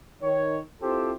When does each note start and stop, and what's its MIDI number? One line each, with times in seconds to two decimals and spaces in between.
0.22 0.59 51
0.22 0.59 73
0.82 1.13 60
0.82 1.13 64
0.82 1.13 65
0.82 1.13 67
0.82 1.13 69
0.82 1.13 72